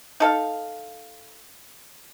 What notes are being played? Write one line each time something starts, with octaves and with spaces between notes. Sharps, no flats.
D#4 A4 F5